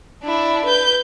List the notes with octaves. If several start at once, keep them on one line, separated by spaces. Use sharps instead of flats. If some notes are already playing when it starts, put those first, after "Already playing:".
D4 E4
B4 G6